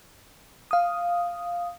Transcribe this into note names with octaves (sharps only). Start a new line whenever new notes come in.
F5 D#6